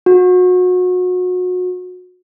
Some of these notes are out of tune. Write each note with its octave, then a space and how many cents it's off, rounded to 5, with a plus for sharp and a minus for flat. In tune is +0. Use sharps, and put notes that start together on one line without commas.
F#4 -30